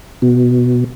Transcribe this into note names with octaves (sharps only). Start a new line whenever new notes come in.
B2